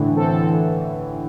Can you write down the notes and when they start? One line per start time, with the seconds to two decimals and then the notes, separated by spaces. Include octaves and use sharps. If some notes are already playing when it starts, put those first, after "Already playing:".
Already playing: A2 D3 E3
0.17 C4 A4
0.50 E3